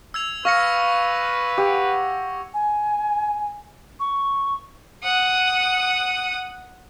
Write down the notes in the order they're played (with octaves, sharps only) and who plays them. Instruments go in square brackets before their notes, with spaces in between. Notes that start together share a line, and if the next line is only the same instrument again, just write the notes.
[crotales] E6 G#6 F7
[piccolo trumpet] B4 [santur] F5 [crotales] C#6 A#6 C#7
[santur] G4 F#5
[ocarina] G#5
C#6
[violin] F#5 D#6